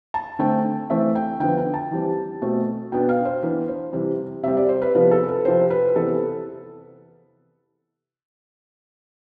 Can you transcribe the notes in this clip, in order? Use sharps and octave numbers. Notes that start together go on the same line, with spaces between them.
A5
D3 A3 C4 G5
E3 A3 C4 E5
G5
D3 F3 B3 G5
G5
A5
E3 G3 C4
B2 A3 C4
B2 B3 D4 G5
F5
C5
E3 B3 D4 B4
C5
C3 E3 G3
C3 G3 C4 E5
D5
C5
B4
C3 F3 B3 B4
A4
B4
C3 F3 C4 C5
B4
C3 E3 B3 A4